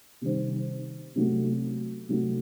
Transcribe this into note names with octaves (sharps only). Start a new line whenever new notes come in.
C3 D#3 G3 C4
C3 F#3 A3
C3 F#3 A3